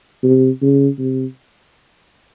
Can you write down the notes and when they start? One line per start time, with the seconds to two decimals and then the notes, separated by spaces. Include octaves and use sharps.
0.23 C3
0.62 C#3
0.99 C3